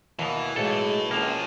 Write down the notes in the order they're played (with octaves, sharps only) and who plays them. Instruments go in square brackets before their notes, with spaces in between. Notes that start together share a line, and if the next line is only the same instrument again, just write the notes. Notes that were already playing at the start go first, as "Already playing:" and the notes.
[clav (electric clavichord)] D#2 B2 [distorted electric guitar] E3
[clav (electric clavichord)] B1 A4 [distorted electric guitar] A2 [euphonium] G#3
[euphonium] C#2 [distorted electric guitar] A#2 F3 [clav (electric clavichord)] A#3